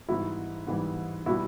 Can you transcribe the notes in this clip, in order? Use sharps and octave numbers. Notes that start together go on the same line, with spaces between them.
G#2 E3 G3 E4 F#4
G#2 E3 G3
B2 G3 E4 F#4